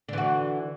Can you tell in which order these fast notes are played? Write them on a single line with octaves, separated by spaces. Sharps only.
D3 E3 F#4